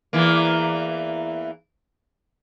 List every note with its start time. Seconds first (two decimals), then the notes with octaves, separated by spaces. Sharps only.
0.13 E2 E3 A#3